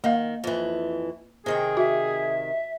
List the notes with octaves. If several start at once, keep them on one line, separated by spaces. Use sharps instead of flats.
D#3 A#3 F5
F2 E3
C3 D#3 G#4 G5
F#4 E5